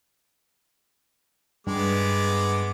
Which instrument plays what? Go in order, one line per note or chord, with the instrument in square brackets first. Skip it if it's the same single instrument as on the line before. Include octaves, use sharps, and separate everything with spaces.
[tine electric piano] G2 [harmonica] G#3 B3 D6